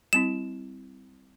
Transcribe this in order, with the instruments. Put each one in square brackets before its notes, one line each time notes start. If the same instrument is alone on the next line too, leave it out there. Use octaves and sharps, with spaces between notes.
[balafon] G3 C4 E4 [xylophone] E7